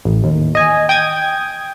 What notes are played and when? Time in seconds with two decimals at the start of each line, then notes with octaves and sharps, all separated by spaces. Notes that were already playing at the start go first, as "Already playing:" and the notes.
0.05 A1
0.24 D#2
0.55 D#5 G#5
0.89 G5 D#6 G#6